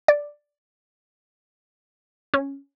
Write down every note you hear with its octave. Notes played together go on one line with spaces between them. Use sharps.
D5
C#4